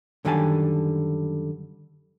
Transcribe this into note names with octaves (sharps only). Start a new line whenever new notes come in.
F#2 D3 D#3 G3 G#5 A5